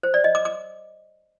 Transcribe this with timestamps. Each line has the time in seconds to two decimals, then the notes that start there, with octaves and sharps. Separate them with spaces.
0.03 C5
0.14 D5
0.24 D#5
0.35 D6
0.45 D6